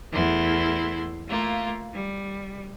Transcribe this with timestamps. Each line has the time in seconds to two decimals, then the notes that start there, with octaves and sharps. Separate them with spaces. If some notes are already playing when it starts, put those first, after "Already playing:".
0.13 E2 A3 E4 C6
1.28 A3 A#3 F4
1.93 G3